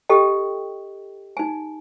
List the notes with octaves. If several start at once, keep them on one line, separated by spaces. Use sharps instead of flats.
G4 A4 D#5 G5
D#4 G#5